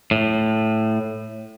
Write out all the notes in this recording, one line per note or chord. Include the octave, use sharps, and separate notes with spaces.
A2